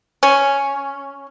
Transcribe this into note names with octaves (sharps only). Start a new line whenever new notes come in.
C#4